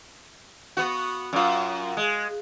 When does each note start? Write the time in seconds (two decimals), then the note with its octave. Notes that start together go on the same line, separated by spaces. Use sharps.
0.77 B3 F#4
1.33 F#2 F4
1.97 G#3